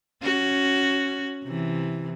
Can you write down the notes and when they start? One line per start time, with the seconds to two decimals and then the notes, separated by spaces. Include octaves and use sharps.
0.23 C#4 F#4
1.45 C3 E3